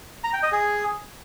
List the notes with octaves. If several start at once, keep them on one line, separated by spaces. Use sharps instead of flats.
A#5
G5
D#5
G#4